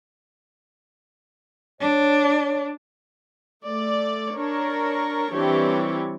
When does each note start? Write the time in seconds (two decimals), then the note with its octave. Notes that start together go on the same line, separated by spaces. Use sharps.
1.81 D4 C#5
3.67 A3 D5
4.38 D4 A#4 C#5
5.34 E3 G3 C4 D4 G4 C#5